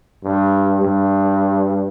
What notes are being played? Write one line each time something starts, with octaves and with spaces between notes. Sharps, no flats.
G2
G2